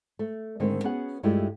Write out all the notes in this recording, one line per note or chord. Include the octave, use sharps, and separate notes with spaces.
A3
G#2 D3 D#3 G#3 A3 C4
B3 C#4 F#4 G#4 F#5
G2 G#3 A3 E4 F4 G4